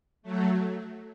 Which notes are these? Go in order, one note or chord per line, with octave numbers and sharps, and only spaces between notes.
F#3 A3